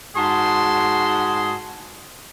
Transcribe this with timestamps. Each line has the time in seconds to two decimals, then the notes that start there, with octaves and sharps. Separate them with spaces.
0.16 G#2 F#4 G#4 A5 C6